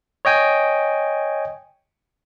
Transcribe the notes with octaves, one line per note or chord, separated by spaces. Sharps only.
C#5 D#5 G5 G#5